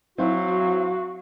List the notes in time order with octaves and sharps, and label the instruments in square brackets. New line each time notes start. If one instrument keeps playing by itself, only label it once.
[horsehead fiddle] F#3 [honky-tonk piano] C4 E4 [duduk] F#4 [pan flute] F5